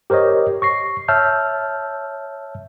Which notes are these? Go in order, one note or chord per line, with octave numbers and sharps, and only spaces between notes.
G4 A#4 C5 C#5 D#5
C#6 A#6 C7
C#5 E5 A5 E6 F6 G6